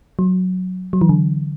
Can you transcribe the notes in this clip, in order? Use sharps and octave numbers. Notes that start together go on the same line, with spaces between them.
F#3
F#3
E3
D3